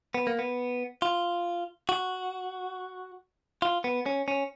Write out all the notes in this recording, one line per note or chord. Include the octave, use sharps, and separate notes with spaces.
B3
A#3
B3
F4
F#4
F4
B3
C#4
C#4